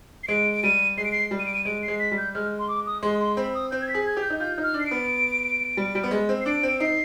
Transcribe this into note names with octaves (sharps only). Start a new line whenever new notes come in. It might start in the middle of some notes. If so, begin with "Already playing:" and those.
C7
G#3 D7
D7
G3 D#7
G#3 C7
D7
C7
G3
D#7
D7
D#7
G#3 D7
C7
G#3
B6
G3
G6
G#3 F6
C6
D6
D#6
G#3 C6
C6
C4 B5
D#6
C4 G6
G#6
B6
G#4
G#6
G4
G6
D#4
F4 G6
D#4
F6
D4
C7
D7
B3
G3
G3
B3
G#3
C4
C7
D4 D7
C4
D7
D#4 C7